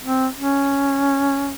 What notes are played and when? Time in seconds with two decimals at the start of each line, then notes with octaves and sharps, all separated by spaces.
0.03 C4
0.37 C#4